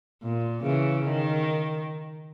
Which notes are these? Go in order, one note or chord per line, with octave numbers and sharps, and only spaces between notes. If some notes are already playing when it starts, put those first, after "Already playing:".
A#2
C#3 E3
D#3